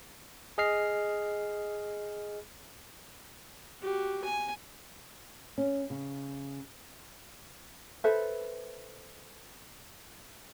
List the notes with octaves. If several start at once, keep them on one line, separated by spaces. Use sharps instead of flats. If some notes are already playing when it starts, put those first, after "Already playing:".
G#4 D#5 F6 C7
F#4 G4
G#5
C#4
C#3
A4 B4 C5 E5